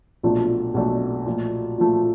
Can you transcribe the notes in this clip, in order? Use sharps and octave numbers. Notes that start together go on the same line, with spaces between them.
B1 A#2 F3 A3 D4
B1 A#2 F3 A3 D4
A#2 F3 A3
A#2 F3 A3